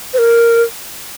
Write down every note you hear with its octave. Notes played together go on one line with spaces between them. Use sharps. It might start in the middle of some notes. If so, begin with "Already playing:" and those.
C5
A#4